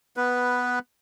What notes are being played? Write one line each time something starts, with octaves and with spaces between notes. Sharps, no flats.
B3 B4